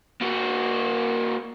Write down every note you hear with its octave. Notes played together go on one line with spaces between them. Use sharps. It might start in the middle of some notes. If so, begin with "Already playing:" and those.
A#3 F#4